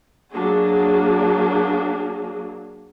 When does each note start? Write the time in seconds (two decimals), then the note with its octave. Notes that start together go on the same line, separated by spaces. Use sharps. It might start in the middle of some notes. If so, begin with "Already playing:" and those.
0.31 F#3 A#3 D4 G#4